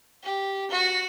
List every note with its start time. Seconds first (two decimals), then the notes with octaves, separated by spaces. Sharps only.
0.23 G4
0.71 F#4